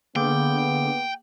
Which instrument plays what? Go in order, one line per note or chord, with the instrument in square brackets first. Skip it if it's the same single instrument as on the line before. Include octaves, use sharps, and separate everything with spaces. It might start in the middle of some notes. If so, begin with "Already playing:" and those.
[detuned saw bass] D3 [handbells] A#3 G#4 D6 [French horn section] B3 [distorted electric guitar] G5